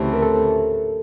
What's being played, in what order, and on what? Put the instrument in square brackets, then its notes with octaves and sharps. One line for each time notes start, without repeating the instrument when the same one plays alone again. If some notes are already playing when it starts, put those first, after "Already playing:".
Already playing: [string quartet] D2 C#3 E3 A3 C4 [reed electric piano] G4
[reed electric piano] A#4
A4